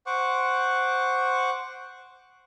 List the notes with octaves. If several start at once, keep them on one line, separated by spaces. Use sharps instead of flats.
C5 F#5 C#6 D6